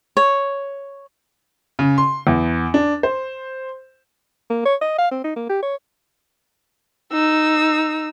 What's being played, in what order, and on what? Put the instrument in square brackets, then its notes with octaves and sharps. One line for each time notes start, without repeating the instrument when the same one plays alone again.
[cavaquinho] C#5
[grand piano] C#3
C6
E2
D4
C5
[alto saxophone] A#3
C#5
D#5
F5
C4
D#4
A#3
G4
C#5
[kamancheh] D#4 E6